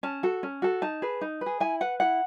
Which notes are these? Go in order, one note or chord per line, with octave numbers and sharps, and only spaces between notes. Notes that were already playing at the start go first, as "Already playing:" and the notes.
C#4 A5
F#4 A4
C#4
F#4 A4
D#4 A5
G#4 B4
D#4
B4
G#4
E4 G#5
B4 F#5
E4 F#5